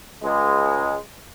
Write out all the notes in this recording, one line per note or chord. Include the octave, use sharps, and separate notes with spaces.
C#2 G#3